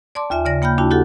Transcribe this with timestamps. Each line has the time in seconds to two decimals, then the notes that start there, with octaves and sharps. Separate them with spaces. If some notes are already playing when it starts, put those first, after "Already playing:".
0.15 D5 A5 C6 D6
0.30 D#2 F4 E5 G#5
0.45 C#3 D5 A#6
0.62 A#3 G5 B5 F6 G6
0.78 D#2 D4 E4 F#4 A5
0.91 E4 F#4 G4 A4 F#5